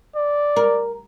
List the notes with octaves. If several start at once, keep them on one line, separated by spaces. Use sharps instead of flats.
D5
A#4